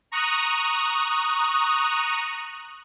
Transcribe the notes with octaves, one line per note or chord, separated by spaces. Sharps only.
A#5 C#6 D#6 F#6